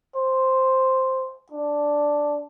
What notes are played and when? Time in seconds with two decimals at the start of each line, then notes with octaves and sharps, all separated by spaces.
0.16 C5
1.52 D4